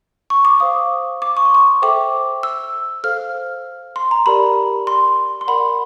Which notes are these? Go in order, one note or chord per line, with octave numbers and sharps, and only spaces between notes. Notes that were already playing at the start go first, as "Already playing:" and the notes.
C#6
D6
C5 F5 D#6
D6
C#6
C6
C#6
A4 C5 E5 G5 D6
E6
A4 C5 F5 F6
C6
A#5
G4 A#4 D5 B5
C6
C6
A#4 D5 F#5 B5